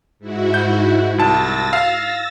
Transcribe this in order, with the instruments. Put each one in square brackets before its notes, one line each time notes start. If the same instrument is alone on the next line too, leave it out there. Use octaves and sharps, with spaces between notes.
[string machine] G#2 E4 F#4
[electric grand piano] G6
[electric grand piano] C2 A5 [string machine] E6 A6 A#6
[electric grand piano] F5